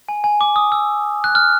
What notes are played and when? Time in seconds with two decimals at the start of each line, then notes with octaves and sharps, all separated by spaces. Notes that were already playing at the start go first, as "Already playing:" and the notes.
0.09 G#5
0.24 G#5
0.41 D6
0.56 D#6
0.72 E6
1.24 F#6
1.35 F6